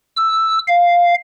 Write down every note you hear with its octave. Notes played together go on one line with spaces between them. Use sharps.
E6
F5